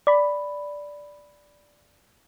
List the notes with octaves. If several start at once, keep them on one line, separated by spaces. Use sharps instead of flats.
D5 B5